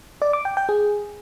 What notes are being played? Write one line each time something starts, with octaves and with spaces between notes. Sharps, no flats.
D5
D6
G5
G5
G#4